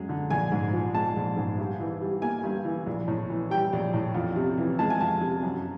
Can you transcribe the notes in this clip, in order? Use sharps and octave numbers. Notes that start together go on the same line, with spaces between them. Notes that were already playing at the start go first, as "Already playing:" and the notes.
Already playing: F#2 G#3
D3
A#1 G#5
G#2
F3
G#3 A5
A#1
G#2
G2
E3
G3
A#3 G#5
G2
E3
A#1
A2
E3
G3 G5
A#1
A2
F2
C3
E3
G#3 A5
G#5
F2 A5
C3
F#2